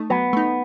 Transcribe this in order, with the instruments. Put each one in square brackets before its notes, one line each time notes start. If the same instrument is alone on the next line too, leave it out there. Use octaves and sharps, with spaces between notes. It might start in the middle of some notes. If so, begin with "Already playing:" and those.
Already playing: [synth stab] A3 D#4
[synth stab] F#3 [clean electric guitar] B3
[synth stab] A3 D#4